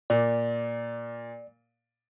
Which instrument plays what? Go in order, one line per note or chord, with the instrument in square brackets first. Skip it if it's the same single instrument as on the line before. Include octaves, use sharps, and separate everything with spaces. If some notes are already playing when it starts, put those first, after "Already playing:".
[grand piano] A#2 [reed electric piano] D5